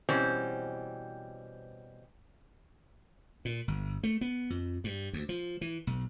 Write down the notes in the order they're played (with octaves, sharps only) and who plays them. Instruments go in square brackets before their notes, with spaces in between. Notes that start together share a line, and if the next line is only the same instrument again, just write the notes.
[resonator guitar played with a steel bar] B2 E3 G3 C4 C#4
[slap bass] A#2
G1
A3
B3
F2
G2
D2
F3
E3
B1